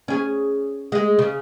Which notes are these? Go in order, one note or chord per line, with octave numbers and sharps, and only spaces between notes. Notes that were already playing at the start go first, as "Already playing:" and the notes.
C#4 G#4
G#3 G#4
C#3